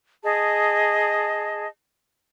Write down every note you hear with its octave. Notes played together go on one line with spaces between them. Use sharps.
G#4 D#5 A5